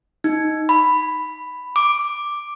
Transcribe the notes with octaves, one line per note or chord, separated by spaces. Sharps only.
D#4
B5
D6